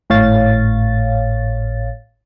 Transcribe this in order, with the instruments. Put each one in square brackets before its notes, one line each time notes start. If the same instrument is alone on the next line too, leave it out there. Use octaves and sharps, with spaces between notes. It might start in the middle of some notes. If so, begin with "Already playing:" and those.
[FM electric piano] G#1 A2 C#5 F5 A6